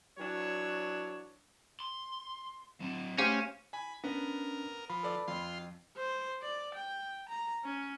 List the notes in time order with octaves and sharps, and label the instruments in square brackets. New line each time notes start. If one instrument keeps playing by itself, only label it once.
[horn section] E3 F#3 D4 C#5
[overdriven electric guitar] C6
F#3 C4
[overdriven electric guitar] A3 [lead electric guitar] C#4 [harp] G4 C5 F5
[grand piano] G#5 [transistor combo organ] B5
[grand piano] B3 [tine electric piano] C#4 D4 [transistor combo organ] A#4
[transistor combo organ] F3 [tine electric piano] B5
[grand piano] A4 B4 D5
[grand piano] F2 [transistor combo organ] F4 C6
[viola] C5
D5
G5
A#5
C#4